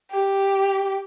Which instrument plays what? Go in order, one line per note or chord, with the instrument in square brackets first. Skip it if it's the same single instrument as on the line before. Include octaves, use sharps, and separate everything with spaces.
[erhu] G4